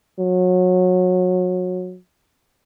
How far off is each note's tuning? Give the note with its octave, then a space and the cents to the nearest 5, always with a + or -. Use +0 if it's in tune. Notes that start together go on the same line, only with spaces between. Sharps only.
F#3 -25